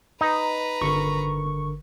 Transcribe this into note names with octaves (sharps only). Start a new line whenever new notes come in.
D#4 B4 A#5
G1 D3 A#4 C#6